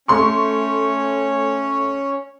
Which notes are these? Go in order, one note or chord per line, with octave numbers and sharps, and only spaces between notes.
A3 C#4 C#5 C6 C#6